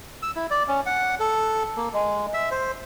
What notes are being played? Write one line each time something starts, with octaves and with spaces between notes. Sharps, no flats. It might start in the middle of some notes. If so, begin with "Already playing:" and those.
E6
E4
D5
C#4
F#5
A4
A#3
G#3
E5
C5